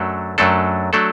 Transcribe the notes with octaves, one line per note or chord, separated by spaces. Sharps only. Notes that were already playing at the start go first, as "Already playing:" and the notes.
Already playing: F#2 F#3 A3 D4 A4
F#2 F#3 A3 D4 A4
F#3 A3 D4 A4